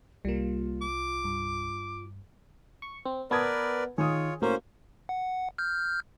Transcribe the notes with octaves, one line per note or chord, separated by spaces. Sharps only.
C2 G3 A#3 F4
D6
G2
C#6
C4
B3 A#4 B4 D5 A5 D#6 G#6
D#3 F4 G#4 C#5 D#6
A2 A#3 C#4 F#4 C5
F#5
F6 G6